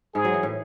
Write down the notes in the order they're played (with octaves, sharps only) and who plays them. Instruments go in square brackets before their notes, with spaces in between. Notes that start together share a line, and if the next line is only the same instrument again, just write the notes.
[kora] G#2 G#3 [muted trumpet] G#4
[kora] F#3
E3
A2